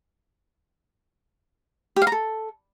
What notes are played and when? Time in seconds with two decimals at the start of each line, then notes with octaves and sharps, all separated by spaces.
1.96 G4
2.02 F5
2.07 A#5
2.12 A4